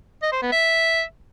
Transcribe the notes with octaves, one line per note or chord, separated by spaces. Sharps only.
D#5
C5
B3
E5